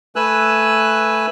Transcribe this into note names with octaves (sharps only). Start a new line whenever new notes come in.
A3 B4 G#5 E6 F#6